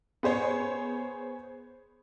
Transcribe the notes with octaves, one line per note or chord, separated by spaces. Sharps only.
B3 G#4 C5 C#5